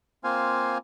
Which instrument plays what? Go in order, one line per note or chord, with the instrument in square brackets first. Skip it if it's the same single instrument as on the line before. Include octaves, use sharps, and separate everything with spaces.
[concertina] A#3 C4 F4 C5 F5 G#5